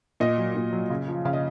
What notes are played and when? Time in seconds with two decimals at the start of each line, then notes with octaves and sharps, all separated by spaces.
0.20 A#2 D#5
0.38 F#3
0.55 A#2
0.73 F#3
0.90 C#3
1.08 F3
1.25 C#3 F5
1.33 D#5